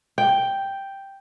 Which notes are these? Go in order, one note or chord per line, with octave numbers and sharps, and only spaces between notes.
G5